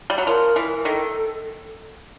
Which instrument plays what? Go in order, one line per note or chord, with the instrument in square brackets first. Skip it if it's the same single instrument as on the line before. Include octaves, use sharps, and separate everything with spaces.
[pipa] G3
F#3
[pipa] F3 [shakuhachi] A#4
[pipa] E3
[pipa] D#3 [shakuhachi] A4